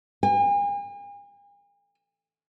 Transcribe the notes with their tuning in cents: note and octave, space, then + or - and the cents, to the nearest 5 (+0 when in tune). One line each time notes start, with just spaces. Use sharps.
G#5 -45